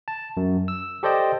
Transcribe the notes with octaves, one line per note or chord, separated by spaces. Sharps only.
A5
F#2
E6
G4 A4 C5 D5 D#5 G5